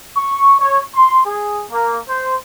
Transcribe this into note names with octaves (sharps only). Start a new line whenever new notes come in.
C#6
C#5
C6
G#4
A#3
C5